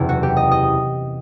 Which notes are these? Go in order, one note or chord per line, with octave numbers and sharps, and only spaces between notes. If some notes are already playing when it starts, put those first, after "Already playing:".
Already playing: F#1 E2 C3 E4
F#4
G4
D#5
D#5